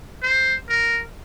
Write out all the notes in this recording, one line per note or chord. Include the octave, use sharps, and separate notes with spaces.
C5
A#4